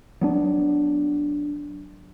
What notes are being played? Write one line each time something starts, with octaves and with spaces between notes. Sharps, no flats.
F#3 B3 D4